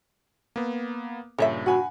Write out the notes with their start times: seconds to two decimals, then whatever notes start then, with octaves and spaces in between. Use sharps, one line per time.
0.56 A#3 B3
1.39 G2 A#2 C#3 A4 C#5 E5
1.66 F#4 F#5 G#5 B5